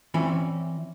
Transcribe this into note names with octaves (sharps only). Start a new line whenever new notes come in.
E3 C4 C#4 B5